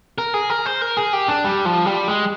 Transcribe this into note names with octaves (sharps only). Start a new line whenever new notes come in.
A#4
G#4
A#4
C5
A#4
G#4
G4
D4
G3
F3
G3
G#3